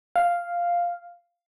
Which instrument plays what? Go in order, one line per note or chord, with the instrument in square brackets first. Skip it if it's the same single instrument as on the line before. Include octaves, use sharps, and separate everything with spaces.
[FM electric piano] F5